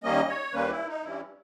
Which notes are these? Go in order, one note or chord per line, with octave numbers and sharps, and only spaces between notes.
D#2 D#3 G3 A#3 C#4 D#5
C#5
D#2 D#3 G3 A#3 C#4 B4
E4
D#4
G2 E3 G3 C#4 E4